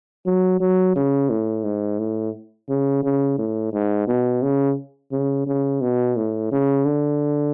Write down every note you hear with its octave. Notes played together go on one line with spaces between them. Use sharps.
F#3
F#3
C#3
A2
G#2
A2
C#3
C#3
A2
G#2
B2
C#3
C#3
C#3
B2
A2
C#3
D3